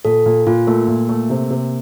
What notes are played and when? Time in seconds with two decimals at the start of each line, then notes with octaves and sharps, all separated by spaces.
0.05 A#2 A4
0.26 A#2
0.47 A#2 F4
0.67 A3 A#3
0.88 A#2
1.09 A3
1.30 C3
1.50 C3